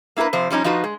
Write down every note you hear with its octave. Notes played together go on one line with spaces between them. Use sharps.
A#3 E4 G#4 A#4 B4
C3 F3 C5
F3 G3 C#4 D#4
F3 D#4 F4 F#4 B4
G#3